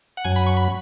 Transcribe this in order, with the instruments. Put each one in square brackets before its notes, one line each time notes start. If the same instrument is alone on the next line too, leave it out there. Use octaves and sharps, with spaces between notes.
[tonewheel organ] F#5
F#2 F#3 G#5
B5
C#6
B5